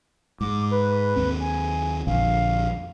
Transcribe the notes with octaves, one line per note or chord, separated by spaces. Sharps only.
G#2 D6
B4
D#2 C4
G#5
A#1 F2 D3 F5